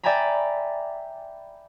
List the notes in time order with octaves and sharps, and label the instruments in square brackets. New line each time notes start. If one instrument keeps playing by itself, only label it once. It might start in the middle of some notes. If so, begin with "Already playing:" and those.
[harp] D5 E5 G5 G#5 A#5 B5